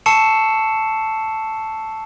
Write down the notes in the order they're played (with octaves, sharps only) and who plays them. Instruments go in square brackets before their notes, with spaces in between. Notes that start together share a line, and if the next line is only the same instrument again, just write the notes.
[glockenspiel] A5 C#6 E6 C7 C#7 E7